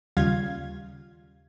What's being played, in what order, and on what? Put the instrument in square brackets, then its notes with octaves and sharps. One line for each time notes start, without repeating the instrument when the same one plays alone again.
[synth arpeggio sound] D#2 C#3 G3 F4 F5 G#6